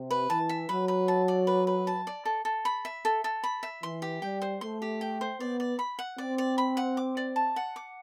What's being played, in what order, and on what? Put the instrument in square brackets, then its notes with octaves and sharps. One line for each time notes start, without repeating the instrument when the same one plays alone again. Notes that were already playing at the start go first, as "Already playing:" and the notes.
Already playing: [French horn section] C3
[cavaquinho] B4
[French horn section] E3 [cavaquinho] A5
[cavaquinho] E5
[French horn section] F#3 [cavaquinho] B4
[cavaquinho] B4
A5
D5
B4
B4
A5
D5
A4
A4
B5
E5
A4
A4
B5
E5
[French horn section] E3 [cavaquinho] C6
[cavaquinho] G4
[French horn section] G3 [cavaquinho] G5
[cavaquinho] C5
[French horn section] A3 [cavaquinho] C6
[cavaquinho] G4
G5
C5
[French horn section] B3 [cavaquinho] D5
[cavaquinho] D5
B5
F#5
[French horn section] C4 [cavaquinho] D5
[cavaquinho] D5
B5
F#5
D6
D5
A5
F#5
D6